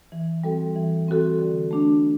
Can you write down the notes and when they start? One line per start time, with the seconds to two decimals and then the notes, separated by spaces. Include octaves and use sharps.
0.12 E3
0.44 G3 C4 F#4 A4
0.76 E3
1.08 G3 C4 F#4 A4
1.39 D3
1.71 A3 D4